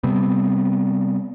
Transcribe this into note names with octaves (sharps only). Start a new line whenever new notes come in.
C3 G3 B3 C4